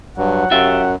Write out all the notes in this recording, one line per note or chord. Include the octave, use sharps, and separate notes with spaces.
G2 F#3 F#5
F#2 F#3 F4 G4 E5